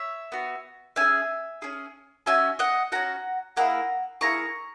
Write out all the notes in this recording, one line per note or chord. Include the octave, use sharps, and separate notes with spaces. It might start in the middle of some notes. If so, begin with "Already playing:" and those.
Already playing: C#5 E5
B3 F#4
C#4 G#4 E5 G#5
C#4 G#4
C#4 F#4 E5 G#5
D#5 F#5
C#4 F#4 F#5 A#5
A#3 E4 G#4 F#5 A#5
A#3 E4 G#4 A#5 C#6